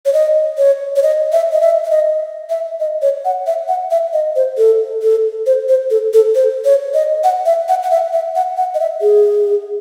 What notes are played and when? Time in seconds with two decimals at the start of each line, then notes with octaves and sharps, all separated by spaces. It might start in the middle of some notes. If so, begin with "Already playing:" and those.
0.06 C#5
0.13 D#5
0.58 C#5
0.96 C#5
1.03 D#5
1.32 E5
1.52 D#5
1.61 E5
1.84 E5
1.91 D#5
2.50 E5
2.80 D#5
3.02 C#5
3.25 F#5
3.47 E5
3.68 F#5
3.91 E5
4.13 D#5
4.36 C5
4.57 A4
5.02 A4
5.46 C5
5.69 C5
5.90 A4
6.14 A4
6.35 C5
6.65 C#5
6.94 D#5
7.24 F#5
7.46 E5
7.68 F#5
7.83 F#5
7.91 E5
8.13 E5
8.35 F#5
8.57 F#5
8.75 D#5
8.80 E5
9.01 G#4